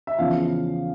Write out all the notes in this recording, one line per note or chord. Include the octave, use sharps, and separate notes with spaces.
E5
E2 C#3 F3 F5